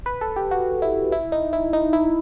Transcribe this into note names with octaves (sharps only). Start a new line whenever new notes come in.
B4
A4
G4
F#4
E4
E4
D#4
E4
D#4
E4